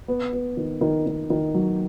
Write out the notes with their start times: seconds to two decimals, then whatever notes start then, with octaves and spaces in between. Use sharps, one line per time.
0.08 B3
0.33 B3
0.57 D#3
0.81 D#3
1.06 D#3
1.30 D#3
1.54 F#3